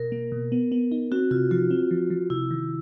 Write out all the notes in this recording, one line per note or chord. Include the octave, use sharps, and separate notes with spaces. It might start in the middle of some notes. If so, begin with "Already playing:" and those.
Already playing: B2 A#4
A#3
B2
B3
B3
D#4
C4 F#4
C3 F4
F3 F4
C4
F3
F3
C3 E4
D#3